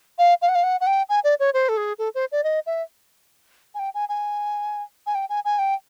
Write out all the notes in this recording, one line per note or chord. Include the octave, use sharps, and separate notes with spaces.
F5
F5
F#5
F5
F#5
F#5
G5
G#5
D5
C#5
C5
A4
G#4
A4
C5
D5
D#5
E5
G#5
G5
G#5
G#5
G#5
G5
G#5
G#5
G5